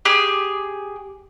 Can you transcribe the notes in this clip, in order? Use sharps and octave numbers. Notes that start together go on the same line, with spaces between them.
G4 G#4